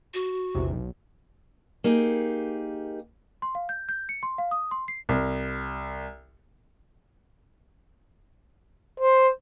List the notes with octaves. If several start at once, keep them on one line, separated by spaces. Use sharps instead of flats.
F#4
A#1 E2 C3
B1
A#3 D#4 G4 G#4
C6
F5
G6
G6
C#7
C6
F5
D#6
C6
C7
C2
C5